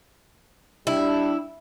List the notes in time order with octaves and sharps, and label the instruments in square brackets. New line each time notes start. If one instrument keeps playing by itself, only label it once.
[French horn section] G3 D4 [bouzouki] E4